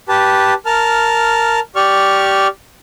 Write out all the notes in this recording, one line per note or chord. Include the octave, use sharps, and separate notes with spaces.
G4 B4 A5
A#4 A5 F6
G4 D5 C#6 F6